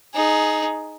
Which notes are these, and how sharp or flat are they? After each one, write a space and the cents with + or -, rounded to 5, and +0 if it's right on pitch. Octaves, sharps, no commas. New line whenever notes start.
D#4 +0 G#4 +15